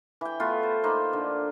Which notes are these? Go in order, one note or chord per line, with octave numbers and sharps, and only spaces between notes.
E3 G5
A3 B3 F4
C5
A#3 D#4 B4 C5
D3